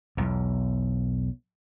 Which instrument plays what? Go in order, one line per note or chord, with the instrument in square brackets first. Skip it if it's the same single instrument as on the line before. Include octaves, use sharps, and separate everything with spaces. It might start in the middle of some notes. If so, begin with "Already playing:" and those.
[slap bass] B1 E2